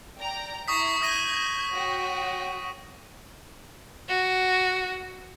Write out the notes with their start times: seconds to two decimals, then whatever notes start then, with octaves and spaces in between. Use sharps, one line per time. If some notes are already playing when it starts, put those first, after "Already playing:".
0.19 D5 G5 A#5
0.68 E4 A#5 C#6 D#6 B6 C7
1.02 D#6 G6 G#6 A#6 D#7
1.73 F#4 C#5 G5
4.09 F#4